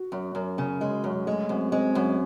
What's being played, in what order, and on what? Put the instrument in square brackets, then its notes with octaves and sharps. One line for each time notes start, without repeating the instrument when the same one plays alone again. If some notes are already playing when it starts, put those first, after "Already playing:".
Already playing: [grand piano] F#4
[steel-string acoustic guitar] F#2
F#2
C#3
G#3
F#2
[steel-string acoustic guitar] G#3 [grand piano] A3
[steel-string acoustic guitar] F#2 [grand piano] C4
[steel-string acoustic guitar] G#3 [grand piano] C4
[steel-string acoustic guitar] F#2